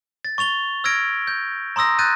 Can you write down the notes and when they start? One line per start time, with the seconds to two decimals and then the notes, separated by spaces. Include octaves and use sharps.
0.25 A6
0.38 C#6 A6 F7 G7
0.84 E6 F6 G#6 A#6 D7
1.27 G6
1.76 A#5 C6 D#6 E6 A#6
1.99 F#6 G6 A6 D#7